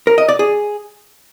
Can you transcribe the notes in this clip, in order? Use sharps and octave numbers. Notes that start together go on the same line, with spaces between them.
A#4
D#5
D5
G#4